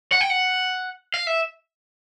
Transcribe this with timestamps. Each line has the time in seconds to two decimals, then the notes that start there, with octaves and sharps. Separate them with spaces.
0.12 F#5
0.21 G5
0.30 F#5
1.14 F5
1.27 E5